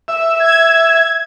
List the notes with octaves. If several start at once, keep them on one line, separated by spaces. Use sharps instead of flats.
E5
G#6